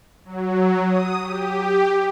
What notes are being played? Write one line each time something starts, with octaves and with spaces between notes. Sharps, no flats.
F#3
D#6
G4